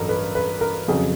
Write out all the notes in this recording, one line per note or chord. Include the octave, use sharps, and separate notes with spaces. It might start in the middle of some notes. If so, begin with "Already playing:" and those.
Already playing: A1 G2 F#3 A4 A#4
B4
B4
A#4
F2 C#3 F#3 G#4